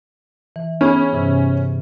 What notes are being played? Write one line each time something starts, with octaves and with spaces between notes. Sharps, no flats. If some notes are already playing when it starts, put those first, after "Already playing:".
E3
B3 C#4 D#4 G#4
G2 C3 E3